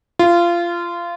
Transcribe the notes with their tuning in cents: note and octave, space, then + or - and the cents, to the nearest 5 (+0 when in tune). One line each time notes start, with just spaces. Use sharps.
F4 -20